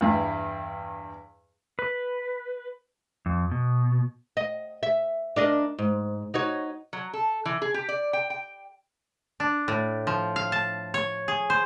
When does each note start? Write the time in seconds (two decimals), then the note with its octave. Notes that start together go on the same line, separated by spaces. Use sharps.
0.01 E2 G2 E4
1.79 B4
3.26 F2
3.51 B2
4.37 D#5
4.83 E5
5.36 D4 A#4 D#5
5.79 G#2
6.34 D#4 F#4 C#5
6.93 F#3
7.13 A4
7.45 E3
7.62 G#4
7.74 G4
7.89 D5
8.13 G5
8.30 G5
9.40 D4
9.68 A2
10.07 F3
10.36 F5
10.52 A5
10.94 C#5
11.28 G#4
11.50 C5